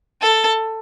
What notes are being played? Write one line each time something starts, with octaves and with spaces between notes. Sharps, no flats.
A4